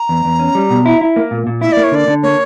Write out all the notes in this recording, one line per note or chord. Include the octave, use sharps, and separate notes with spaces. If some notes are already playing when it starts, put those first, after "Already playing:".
Already playing: A#5
E2
E2
C#4
G3
B2
E4
E4
A#3
A#2
A#2
E4 E5
A#3 D5
C#5
D3 D5
D3
A#3 C#5